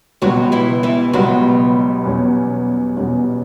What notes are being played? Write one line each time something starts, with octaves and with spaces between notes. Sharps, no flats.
C#2 B2 F#3 G3 B3 F#4
E3 E4
E3 E4
C#2 B2 F#3 G3 B3 F#4
E2 B2 G3 C#4
E2 B2 G3 C#4